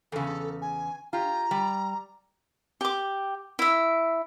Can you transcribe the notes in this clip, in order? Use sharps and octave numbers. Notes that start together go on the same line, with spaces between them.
E2 C#3 A4
G#5
F4 G4 A#5
G3
G4 D6
E4 E5